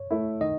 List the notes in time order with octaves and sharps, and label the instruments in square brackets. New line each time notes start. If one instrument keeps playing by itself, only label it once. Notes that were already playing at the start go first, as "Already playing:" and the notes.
Already playing: [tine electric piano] C#5
[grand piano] A3 E4
[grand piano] D#3 [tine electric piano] D#5